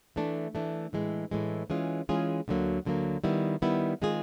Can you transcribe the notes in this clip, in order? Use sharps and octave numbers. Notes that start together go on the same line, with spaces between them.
E3 A3 D4
E3 A3 D4
A2 E3 G#3
A2 E3 G#3
E3 G#3 C#4 F4 G#4
E3 G#3 C#4 F4 G#4
D2 D3 F#3 A#3
D2 D3 F#3 A#3
D#3 G3 B3 E4
D#3 G3 B3 E4
D#3 G#3 C4 F4 G#4